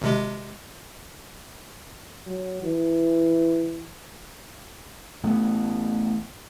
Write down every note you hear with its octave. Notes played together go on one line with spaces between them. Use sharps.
G#1 C3 G#3
F#3
E3
A1 A3 B3